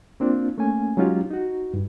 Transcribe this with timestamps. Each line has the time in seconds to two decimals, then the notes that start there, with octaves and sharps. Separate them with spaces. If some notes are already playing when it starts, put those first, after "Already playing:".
0.20 A#3 C4 D4 F4
0.58 A3 A#3 C#4 G#5
0.97 F#3 G#3 C#4 D#4 F4 G4
1.31 D#4 F#4
1.74 G2